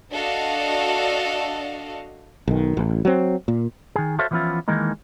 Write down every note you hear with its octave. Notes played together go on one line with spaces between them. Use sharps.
D4 F#4 A4 D5 D#5 F5
B1 D#3
A1
F#3 C4
A#2
D#3 G#4
F#4 A4 C5 C#5 E5 F5
E3 F3 B3 C#4 E4 F4
D#3 E3 G#3 A#3 D#4